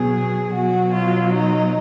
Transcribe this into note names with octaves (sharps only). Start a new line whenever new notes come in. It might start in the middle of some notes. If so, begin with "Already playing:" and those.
Already playing: B2 F#3 G#4
B2 F#3 F#4
F4
D#4